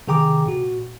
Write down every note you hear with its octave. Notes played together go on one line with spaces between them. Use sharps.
C3 D#3 G#4 G5 A#5 D6
A#2 F#4